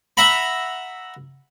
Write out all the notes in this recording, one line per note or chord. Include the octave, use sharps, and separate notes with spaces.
E5 F#5 A#5 B5